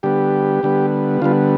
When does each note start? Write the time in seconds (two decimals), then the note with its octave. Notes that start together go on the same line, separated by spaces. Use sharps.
0.03 D3 G3 B3 G4
0.63 D3 G3 B3
1.22 D3 G3 B3 F4